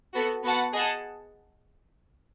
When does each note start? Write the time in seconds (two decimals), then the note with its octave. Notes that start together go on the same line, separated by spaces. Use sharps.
0.14 B3 F#4 A4
0.43 B3 F#4 B4 F#5 A5
0.73 G#4 D#5 F#5 A5